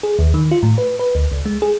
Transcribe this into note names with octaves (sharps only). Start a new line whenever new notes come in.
G#4
D#2
D#3
F4
A2
B4
B4
D2
C#2
G#3
G#4